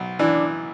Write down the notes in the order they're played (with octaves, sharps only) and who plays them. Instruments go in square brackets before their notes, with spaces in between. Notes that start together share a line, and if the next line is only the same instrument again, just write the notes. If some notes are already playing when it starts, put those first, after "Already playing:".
Already playing: [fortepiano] B1
[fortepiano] E3 [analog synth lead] D4